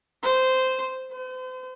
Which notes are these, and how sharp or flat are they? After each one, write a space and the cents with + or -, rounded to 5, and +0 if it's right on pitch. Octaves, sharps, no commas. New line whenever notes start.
C5 -10
C5 -40